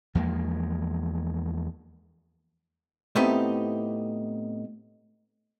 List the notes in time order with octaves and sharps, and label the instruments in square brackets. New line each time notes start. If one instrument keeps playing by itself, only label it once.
[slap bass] E2 F3 G#3 A#3
[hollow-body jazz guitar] A2 A3 B3 C4 D#4 G4